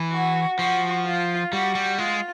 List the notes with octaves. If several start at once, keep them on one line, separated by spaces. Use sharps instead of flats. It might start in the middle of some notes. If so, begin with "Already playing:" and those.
Already playing: E3
F#4
F3 F#4
F4
G3 F#4
G3
G#3 F4